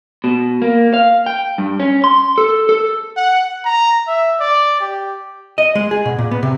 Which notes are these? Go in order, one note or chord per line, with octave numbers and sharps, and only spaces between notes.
B2
A#3
F5
G5
G2
C#4
C6
A4
A4
F#5
A#5
E5
D5
G4
D#5
G#3
G#4
B2
A#2
B3
C3